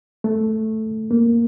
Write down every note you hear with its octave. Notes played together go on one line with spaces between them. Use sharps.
A3
A#3